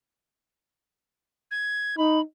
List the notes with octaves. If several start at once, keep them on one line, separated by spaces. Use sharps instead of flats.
G#6
D#4 B5